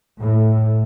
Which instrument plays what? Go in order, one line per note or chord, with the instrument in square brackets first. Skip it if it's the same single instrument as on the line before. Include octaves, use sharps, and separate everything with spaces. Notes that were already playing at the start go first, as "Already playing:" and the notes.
[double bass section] A2